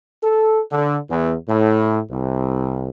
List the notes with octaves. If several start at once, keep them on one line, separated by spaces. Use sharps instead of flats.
A4
D3
E2
A2
C2